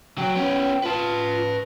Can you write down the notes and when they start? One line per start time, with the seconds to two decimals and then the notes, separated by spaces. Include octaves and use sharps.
0.18 F#3 G5
0.36 B3 C#4
0.83 F4 B4 A5